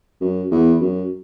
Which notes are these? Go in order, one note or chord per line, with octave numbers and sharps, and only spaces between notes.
F#2
E2
F#2